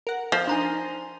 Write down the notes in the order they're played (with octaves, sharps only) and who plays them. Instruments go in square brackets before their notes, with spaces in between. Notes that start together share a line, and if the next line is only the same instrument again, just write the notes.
[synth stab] A#4 F#5
[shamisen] F3
[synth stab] D4 D#4 [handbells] G#5 A#5 C6